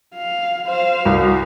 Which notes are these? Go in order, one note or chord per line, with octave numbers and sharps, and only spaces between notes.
F5
C5 F5
C2 F#4